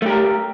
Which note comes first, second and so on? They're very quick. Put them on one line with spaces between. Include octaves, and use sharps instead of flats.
A3 G4 A#4